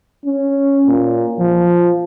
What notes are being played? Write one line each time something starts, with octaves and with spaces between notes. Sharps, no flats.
C#4
A#2
F3